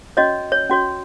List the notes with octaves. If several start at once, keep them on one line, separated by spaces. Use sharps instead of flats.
C#4 F#4 C#5 D#5
C#5
C#4 F#4 C#5